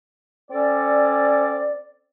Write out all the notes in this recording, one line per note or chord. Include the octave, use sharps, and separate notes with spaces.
C4 C#4 A4 D5